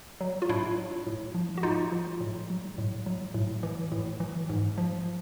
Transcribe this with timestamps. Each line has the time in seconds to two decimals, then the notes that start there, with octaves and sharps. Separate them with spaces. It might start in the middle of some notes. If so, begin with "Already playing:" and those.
0.20 F#3
0.42 F4
0.49 A2 D4 E4
0.78 F#3
1.07 A2
1.35 F3
1.58 F#4
1.63 A2 D#4 F4
1.92 F3
2.21 A2
2.50 F#3
2.78 A2
3.06 F#3
3.34 A2
3.63 E3
3.92 A2
4.20 E3
4.49 G#2
4.78 F3